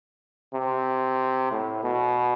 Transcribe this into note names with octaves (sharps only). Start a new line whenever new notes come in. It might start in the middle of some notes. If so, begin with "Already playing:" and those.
C3
A2
B2